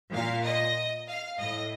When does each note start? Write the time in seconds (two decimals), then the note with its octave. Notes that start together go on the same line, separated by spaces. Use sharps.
0.13 A#2 F5
0.44 D#5
1.07 F5
1.38 A2 D#5